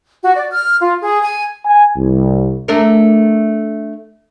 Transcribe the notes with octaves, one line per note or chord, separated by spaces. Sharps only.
F#4
D5
F6
F4
G#4
G#5
G#5
C2
A3 D4 A#4